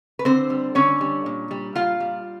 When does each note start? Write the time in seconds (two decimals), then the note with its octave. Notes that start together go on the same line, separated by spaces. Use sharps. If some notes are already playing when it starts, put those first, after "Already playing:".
0.19 B4
0.25 D3 C4 C5
0.50 G3
0.75 D3 C#4 C#5
1.01 G3
1.26 A#2
1.51 G3
1.75 A#2 F4 F5
2.00 G3